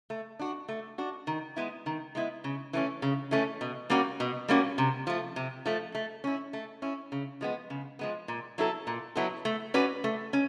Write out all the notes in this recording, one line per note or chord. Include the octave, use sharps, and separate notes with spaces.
A3
D4 F#4
A3
D4 F#4
D#3
G#3 B3 E4
D#3
G#3 B3 E4
C#3
E3 A3 C#4
C#3
E3 A3 C#4
B2
G3 A#3 C#4 F#4
B2
G3 A#3 C#4 F#4
C3
F3 A3
C3
F3 A3
A3
C#4 E4
A3
C#4 E4
C#3
F3 G#3 B3
C#3
F3 G#3 B3
A#2
F#3 B3 E4 A4
A#2
F#3 B3 E4 A4
A3
C#4 F#4 B4 D5
A3
C#4